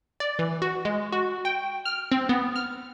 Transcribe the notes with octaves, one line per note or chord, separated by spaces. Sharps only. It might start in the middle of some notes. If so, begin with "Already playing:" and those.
D5
E3
F#4
G#3
F#4
G5
F6
C4
B3
F6